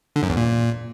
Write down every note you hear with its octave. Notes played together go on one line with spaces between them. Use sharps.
D3
F#2
E2
A#2